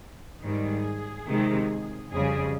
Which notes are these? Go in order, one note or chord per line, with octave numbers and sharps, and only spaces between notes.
G#2 D#3 G3 G#4
C3 D#3 G#3
F2 C#3 G3 G#4